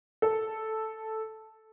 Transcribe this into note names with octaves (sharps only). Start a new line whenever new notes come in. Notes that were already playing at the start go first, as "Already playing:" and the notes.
A4